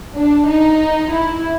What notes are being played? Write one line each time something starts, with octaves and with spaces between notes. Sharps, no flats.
D4
D#4
E4